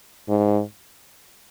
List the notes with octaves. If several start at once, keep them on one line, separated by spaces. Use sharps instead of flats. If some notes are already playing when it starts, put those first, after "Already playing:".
G#2